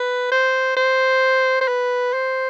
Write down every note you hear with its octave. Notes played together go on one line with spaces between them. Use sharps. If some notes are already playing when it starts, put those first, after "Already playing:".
Already playing: B4
C5
C5
C5
B4
C5